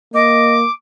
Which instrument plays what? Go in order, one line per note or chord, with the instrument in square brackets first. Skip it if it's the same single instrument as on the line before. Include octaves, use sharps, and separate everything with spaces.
[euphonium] A#3 [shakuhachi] D#5 [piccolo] D6